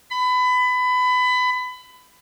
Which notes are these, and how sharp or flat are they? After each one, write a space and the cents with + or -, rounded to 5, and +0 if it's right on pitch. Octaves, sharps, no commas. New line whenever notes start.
B5 +25